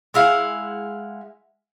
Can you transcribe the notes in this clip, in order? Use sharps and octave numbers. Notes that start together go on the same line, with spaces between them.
G#3 E4 F5 F#5